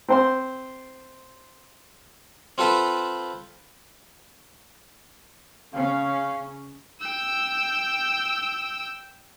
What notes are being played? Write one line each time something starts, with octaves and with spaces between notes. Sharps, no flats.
C4 C5 C6
C4 F4 A4 B4 C5
C#3 C#4 F5
G5 E6